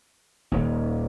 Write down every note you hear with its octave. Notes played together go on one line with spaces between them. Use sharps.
D#1 D#2